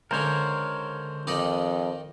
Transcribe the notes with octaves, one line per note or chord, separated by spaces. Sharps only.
C#2 D3 A#4 C5 C#5
F2 D#3 D#4 D5